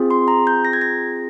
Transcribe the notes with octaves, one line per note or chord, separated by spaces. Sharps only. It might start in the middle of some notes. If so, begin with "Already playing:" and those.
Already playing: C4 F4 G#4
C6
A#5
G6
A#6
G#6
A#6